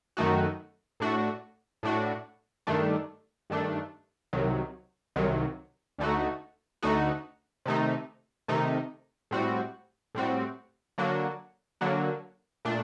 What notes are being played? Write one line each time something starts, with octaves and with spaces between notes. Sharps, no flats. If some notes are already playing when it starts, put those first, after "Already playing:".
F#2 D#3 A3 D#4 F#4
A2 A3 D4 F#4
A2 A3 D4 F#4
G2 D#3 A3 D4
G2 D#3 A3 D4
C2 C3 D#3 F#3
C2 C3 D#3 F#3
D2 D3 A3 D#4 F#4
D2 D3 A3 D#4 F#4
C3 D#3 A3 D#4
C3 D#3 A3 D#4
A2 G3 C4 F#4
A2 G3 C4 F#4
D3 F#3 A#3 D4 F#4
D3 F#3 A#3 D4 F#4
A#2 A3 D4